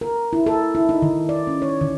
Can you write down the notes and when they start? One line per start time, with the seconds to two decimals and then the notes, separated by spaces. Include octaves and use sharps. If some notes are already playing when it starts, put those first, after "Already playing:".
0.01 A#4
0.33 E4
0.46 A4
0.75 E4
0.89 D#4
1.02 D#3
1.29 D5
1.47 C#4
1.62 C#5
1.81 D#3